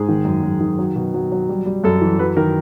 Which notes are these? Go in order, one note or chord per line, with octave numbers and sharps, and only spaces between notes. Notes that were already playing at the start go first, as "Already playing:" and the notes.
Already playing: G#2 G#4
D#3
F#2
F#2
D#3
F#3
B2
F#3
F#3
G3
G3
F#2 A4
E3
F#3 B4
D#3 A#4